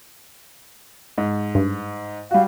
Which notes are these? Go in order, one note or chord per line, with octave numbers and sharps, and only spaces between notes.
G#2
G2
G3 F#4 F5